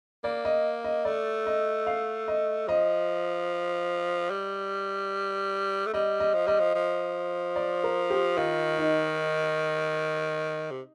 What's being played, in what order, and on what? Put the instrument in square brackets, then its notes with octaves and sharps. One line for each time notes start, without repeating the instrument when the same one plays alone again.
[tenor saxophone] A#3 [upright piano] D5
[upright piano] D#5
D#5
[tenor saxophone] A3 [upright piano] D5
[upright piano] D#5
F5
D#5
[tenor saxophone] F3 [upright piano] D#5
[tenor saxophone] G3
A3
[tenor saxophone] G3 [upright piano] D#5
[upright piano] D#5
[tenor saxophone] F3
[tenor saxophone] G3 [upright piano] D#5
[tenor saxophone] F3
F3
[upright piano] D5
A#4
G4
[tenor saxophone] D#3 [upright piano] F4
[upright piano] D#4
[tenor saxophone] C3